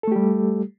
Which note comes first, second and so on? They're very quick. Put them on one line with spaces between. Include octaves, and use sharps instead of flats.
A4 A3 G4 G3